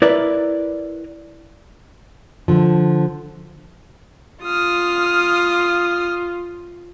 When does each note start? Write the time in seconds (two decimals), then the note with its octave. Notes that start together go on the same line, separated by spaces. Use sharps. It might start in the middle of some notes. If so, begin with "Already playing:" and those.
0.02 E4 A#4 B4 D5
2.48 D3 F3
4.44 F4 D#6 F6